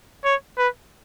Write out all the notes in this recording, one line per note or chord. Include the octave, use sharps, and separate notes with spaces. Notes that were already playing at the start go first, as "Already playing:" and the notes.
C#5
B4